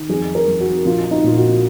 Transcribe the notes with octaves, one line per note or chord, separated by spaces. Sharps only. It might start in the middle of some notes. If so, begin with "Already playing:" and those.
Already playing: D#3
F2 G#4
A#4
F2
F#4
A#1 F4
D#4
A#2 F4
F#4